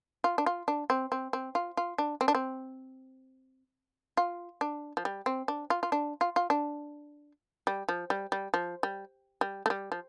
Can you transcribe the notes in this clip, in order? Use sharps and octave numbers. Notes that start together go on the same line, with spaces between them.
F4
D4
F4
D4
C4
C4
C4
F4
F4
D4
C4
D4
C4
F4
D4
F3
G3
C4
D4
F4
F4
D4
F4
F4
D4
G3
F3
G3
G3
F3
G3
G3
A3
G3
F3